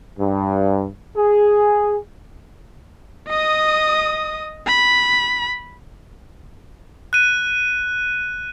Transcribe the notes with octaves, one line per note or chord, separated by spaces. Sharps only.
G2
G#4
D#5 D#6
B5
F#6 D#7